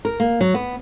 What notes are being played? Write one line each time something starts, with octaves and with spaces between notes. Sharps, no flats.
A#4
A#3
F#3
B3